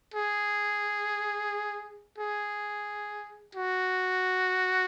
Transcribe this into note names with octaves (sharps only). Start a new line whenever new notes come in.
G#4
G#4
F#4